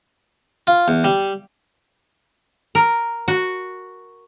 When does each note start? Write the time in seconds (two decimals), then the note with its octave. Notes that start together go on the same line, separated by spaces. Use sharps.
0.67 F4
0.88 E2
1.04 G3
2.75 A#4
3.28 F#4